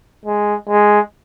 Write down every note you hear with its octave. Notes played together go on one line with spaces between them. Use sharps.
G#3
G#3